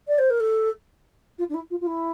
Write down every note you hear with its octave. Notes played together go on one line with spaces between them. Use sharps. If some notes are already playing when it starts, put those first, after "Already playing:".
D5
C5
A#4
A4
F4
D4
E4
F4
F4
E4